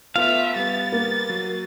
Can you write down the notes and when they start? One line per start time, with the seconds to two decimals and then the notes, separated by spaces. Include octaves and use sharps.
0.16 A3 B3 F4 E5 F5
0.56 G3 B3 A6
0.92 A#3
1.30 F#3